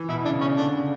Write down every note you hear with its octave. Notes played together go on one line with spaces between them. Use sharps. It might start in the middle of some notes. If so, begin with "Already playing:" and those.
Already playing: E3
B2 E4
C#3 D4
C#3 C#4
D3 D4
C#3